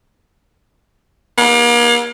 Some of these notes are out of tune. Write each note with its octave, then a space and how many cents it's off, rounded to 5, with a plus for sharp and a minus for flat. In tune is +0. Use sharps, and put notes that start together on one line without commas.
A#3 +40